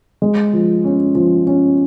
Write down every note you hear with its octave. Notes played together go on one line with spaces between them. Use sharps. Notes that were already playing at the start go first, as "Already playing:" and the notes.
G#3
F3
C#4
F3
C#4